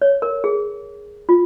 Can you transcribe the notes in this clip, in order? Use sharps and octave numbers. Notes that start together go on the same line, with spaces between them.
C#5
A#4
G#4
F4